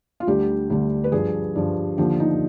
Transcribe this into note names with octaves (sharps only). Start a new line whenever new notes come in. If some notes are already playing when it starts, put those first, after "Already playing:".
F4
D2 D3 G3 G4
D2 D3 G3
B4
G2 F3 G#4
G2 F3
D#2 D3 F3 G4
D#4